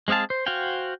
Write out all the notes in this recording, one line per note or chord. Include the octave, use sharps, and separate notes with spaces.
G#3 C4 G#4 F5 A5
C5
F#4 C5 F5 G5 G#5